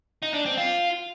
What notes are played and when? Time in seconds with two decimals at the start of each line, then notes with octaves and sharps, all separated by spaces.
0.22 D#4
0.34 D4
0.46 C4
0.57 F4